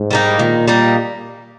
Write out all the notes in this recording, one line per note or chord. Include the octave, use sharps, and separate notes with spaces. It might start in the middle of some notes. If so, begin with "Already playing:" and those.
Already playing: G#2
G3 A#3 D#4
A#2 D#3
G3 A#3 D#4